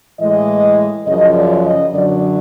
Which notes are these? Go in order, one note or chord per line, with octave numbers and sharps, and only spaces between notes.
A2 E3 G#3 D#5
F#2 C#3 F3 D#5
D5
D#5
F#2 D3 F#3 D5